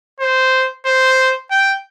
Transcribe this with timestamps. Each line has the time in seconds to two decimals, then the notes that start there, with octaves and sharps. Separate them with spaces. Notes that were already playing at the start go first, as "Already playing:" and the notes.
0.20 C5
0.85 C5
1.51 G5